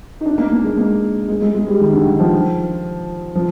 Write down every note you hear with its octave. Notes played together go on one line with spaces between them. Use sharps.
D#4
D4
A#3
A#3
G#3
A#3
G#3
G#3
G#3
G3
D#3
D3
D#3
F3
F3